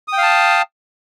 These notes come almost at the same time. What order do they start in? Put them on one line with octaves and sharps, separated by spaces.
D#6 G5 F5 A5